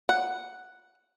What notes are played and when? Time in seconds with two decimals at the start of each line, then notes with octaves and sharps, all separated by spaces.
0.09 F#5